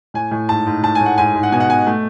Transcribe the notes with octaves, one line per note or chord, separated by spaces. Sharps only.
A2 G#5
A2
G#2 A5
G#2
A2 A5
G#5
A2
F#5
G#2 G#5
G#2
F#5
B2 G#5
F#5
B2 G#5
A3